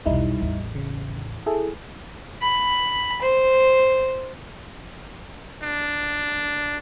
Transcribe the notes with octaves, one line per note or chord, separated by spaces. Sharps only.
B1 E2 G3 D#4 E4
A1 E2
C#3
E4 G#4 A4
B5
C5
D4